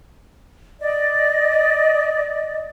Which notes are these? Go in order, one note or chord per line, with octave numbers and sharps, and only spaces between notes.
D5 D#5